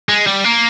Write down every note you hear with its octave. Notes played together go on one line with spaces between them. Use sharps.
G#3
G3
A#3